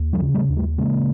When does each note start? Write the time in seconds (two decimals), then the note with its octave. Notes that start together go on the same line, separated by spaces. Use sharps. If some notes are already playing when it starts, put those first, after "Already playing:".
Already playing: D#2
0.13 F3 G3
0.20 C#3
0.34 G3 A3
0.49 D#2
0.56 G3 A3
0.78 C#3 G#3 A#3